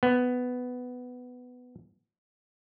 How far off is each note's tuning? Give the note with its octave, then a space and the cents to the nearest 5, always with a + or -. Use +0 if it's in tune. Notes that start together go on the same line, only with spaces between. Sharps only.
B3 +10